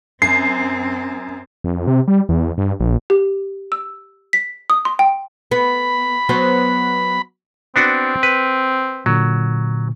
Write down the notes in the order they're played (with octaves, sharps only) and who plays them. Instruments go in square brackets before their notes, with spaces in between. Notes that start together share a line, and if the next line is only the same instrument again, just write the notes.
[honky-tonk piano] F#2 [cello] C4 [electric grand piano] C7
[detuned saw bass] F2
C3
G3
E2
G2
A#1
[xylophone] G4
E6
B6
D#6
C6
G5
[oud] B3 [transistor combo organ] B5
[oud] F#3 B3 C5
[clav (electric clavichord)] B3 D4 F#4 [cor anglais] C4
[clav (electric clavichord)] B4
[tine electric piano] A#2 D3 [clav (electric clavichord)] F#3